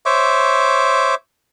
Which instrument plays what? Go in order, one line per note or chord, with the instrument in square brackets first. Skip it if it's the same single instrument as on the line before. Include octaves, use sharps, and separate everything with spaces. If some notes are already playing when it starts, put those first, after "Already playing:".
[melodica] C5 C#5 E5 D6